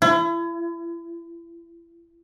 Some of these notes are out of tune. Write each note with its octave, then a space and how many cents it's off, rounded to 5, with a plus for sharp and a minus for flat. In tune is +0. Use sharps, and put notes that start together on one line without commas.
E4 +35